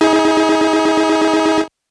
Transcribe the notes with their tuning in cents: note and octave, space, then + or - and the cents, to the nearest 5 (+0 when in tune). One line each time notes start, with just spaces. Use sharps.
D#4 +40 G#4 +0